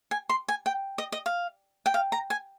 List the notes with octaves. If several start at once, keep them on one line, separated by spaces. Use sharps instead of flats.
G#5
C6
G#5
G5
D#5
D#5
F5
G5
F5
A#5
G#5